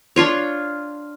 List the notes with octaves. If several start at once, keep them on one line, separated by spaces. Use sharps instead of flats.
D4 F4 C#5